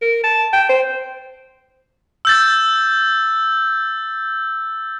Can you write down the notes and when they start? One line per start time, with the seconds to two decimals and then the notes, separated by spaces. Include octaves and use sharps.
0.02 A#4
0.24 A5
0.53 G5
0.69 C5
2.25 E6 G6 A6